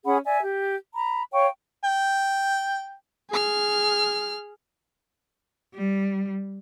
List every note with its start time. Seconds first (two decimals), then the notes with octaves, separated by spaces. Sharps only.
0.05 C#4 G#4 F#5 B5
0.25 D5 E5 G#5
0.41 G4
0.94 A#5 B5
1.33 C#5 F5 G5 C#6
1.84 G5
3.30 G#4 F6
5.75 G3